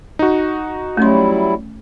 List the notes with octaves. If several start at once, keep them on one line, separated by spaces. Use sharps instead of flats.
D#4 F#4
F#3 G3 A3 C#4 E4 C6